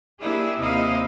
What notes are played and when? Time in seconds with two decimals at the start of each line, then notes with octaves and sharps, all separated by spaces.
0.21 A#3 D4 E4 G4 G#4
0.58 D#2 C3 D#4 E4 D#5 F5